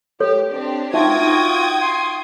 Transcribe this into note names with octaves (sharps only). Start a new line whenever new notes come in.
G4 A4 C#5
C4 D4 G4
D#4 F4 F#4 E5 G5 D#6 G#6
C6